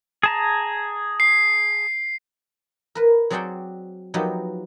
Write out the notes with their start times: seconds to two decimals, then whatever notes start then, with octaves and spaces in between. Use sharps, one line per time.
0.23 G#4 A5 A#5
1.20 C7
2.95 A#4 B4
3.30 F#3 C4 G#4 D5 F#5 G5
4.14 F3 F#3 B3 D#4 G4